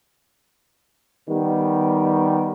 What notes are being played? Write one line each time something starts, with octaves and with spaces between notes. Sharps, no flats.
D#3 G3 B3